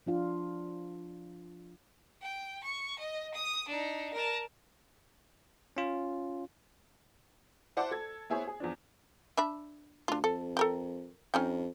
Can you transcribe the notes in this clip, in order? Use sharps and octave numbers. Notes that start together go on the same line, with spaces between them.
F3 D4 F4
G5
C#6
D#5
D#6
D4 D#4
A#4 A5
C#4 F4
E4 C5 D5 F#5 A5 D6
A4 G#6
B3 E4 G#4 C5 C#5
G#4
E2 F3 D4
D4 E5 B5
D2 D4 F4
F2 A4
A4 A#4 G5
F2 C#4 D#4 G5